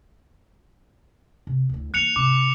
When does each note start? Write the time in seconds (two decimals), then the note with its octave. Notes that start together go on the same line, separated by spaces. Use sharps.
1.47 C3
1.69 D2 E4
1.94 E3 A#3 F#6 C#7 F7
2.16 G#2 C3 D6